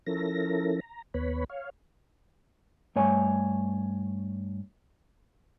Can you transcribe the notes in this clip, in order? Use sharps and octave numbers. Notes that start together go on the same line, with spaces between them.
F3 C#4 E4 A4 A#4 A#6
A#5
D#2 B3 B4 C#5 B5
C#5 F5
G2 A3 C#5 G#5